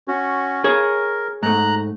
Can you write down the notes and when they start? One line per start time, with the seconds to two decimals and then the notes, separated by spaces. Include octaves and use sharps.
0.08 C#4 F#4
0.64 G#4 A#4 C#5
1.43 G#2 A3 A#5 F#6